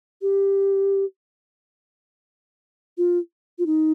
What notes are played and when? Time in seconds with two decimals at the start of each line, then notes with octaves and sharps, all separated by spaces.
0.22 G4
2.98 F4
3.59 F4
3.66 D#4